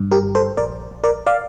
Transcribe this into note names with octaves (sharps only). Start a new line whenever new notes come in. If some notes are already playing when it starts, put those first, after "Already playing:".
Already playing: G2
G4 A#4
G1
A4 C5
A#1 A#4 D5
A#1
A#4 D5
D5 F5